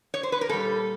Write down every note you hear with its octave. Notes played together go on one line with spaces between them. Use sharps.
C#5
C5
B4
A#4
A#2 G3 A4